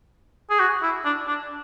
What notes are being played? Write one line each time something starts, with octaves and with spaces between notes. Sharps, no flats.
G#4
F#4
E4
D4
D4